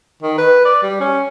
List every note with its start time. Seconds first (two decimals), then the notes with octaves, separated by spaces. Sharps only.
0.23 D#3
0.38 B4
0.65 D5
0.83 G3
1.00 C#4